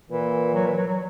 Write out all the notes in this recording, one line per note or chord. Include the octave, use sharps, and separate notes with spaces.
A#2 E3
F#3
E3
F#3
F#3